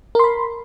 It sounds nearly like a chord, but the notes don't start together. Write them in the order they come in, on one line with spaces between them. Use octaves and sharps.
A#4 C6 B5